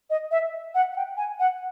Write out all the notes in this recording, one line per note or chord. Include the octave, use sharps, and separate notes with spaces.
D#5
E5
F#5
F#5
G5
G#5
F#5